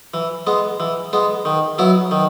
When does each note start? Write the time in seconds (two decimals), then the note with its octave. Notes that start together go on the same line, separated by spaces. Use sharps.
0.14 E3
0.47 G#3 B3
0.80 E3
1.13 G#3 B3
1.45 D#3
1.78 F#3 B3 E4
2.11 D#3